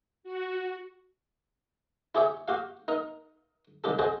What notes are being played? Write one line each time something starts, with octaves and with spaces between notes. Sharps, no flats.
F#4
E4 G4 G#4 C#5 E5
F#4 G4 F5
D#4 A#4
C2 D#3 G4 A4
C4 F#4 G#4 A4 C5 D#5